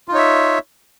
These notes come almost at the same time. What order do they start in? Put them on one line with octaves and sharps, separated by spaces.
F4 D#4 C#5 E5